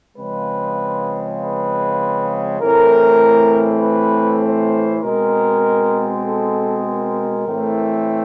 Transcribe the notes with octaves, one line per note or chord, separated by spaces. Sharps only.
C#3 F3 G#3 C4 B4
B4
A2 E3 A3 C4 A#4
B4
C5
B2 G#3 C4 A#4
A4
A#4
A2 E3 A3 C4